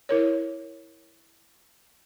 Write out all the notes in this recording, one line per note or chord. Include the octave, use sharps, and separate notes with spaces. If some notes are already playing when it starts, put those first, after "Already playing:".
E4 A#4 C#5